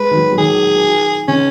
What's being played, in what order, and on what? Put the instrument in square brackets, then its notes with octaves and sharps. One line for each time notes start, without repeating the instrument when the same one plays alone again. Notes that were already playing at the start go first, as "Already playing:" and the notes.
Already playing: [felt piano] G#3 [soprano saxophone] B4
[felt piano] D#3
F#3
F#3
[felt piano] D#3 [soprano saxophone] G#4
[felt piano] C#3 [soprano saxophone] C#4